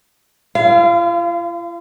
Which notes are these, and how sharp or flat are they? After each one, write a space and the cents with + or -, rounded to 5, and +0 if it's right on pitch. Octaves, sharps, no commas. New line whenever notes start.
F4 -45 F5 -20